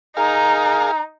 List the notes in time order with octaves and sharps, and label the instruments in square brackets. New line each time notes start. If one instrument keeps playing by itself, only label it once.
[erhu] D#4 [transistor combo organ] G#4 A#4 F5 [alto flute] A#5